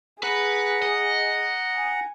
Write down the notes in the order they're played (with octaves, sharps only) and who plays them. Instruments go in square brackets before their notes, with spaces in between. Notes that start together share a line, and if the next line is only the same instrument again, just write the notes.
[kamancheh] G#4 [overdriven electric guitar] B4 [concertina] F#5 A#5
[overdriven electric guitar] D#5
[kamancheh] G#5